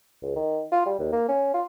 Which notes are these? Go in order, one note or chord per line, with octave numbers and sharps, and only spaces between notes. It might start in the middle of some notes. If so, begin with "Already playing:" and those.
C#2
D#3
F4
G3
D#2
A#3
C#4
F4